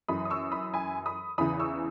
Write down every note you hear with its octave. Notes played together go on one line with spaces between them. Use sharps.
F#2 E3 B5 D#6
D#6
C#6 E6
B5 D#6
G#5 B5
B5 D#6
E2 C#3 E3 B5 D#6
C#6 E6